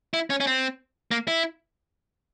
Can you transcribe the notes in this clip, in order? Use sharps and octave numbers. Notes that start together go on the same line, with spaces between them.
E4
C#4
C#4
C4
A#3
E4